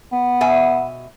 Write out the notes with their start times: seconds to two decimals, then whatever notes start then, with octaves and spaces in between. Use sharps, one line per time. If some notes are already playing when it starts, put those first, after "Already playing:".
0.12 B3
0.41 B2 E5 G#5